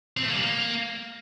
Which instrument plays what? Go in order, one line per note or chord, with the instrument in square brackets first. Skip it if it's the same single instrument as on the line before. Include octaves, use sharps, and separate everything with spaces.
[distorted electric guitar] C4
A3
A#3
G3
A#3